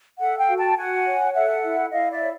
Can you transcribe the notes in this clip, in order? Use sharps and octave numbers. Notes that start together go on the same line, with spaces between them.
A4 E5 F#5
F5 G5
F#4
G5 A5
F#4 F#5 G#5
C#5
A4 E5 F#5
E4
E4 D#5 F5
D5 E5
C#5